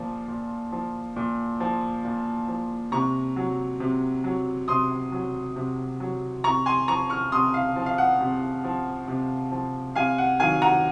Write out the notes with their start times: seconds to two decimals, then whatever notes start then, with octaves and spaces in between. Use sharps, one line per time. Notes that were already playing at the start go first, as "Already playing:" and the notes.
Already playing: A#2 F3
0.28 A#2
0.72 F3
1.16 A#2
1.60 F3
2.05 A#2
2.48 F3
2.92 C3 A#5 C#6
3.36 F#3
3.80 C3
4.24 F#3
4.68 C3 C6 D#6
5.12 F#3
5.56 C3
6.00 F#3
6.44 C3 A#5 C#6
6.66 G#5 C6
6.88 F3 A#5 C#6
7.10 C#6 F6
7.32 C3 C6 D#6
7.54 F5
7.76 F3
7.86 F5
7.98 F#5
8.21 C3
8.64 F3
9.08 C3
9.52 F3
9.95 C3 F5 G#5
10.18 F#5
10.40 D#3 F#3 F5 G#5
10.62 F#5 A#5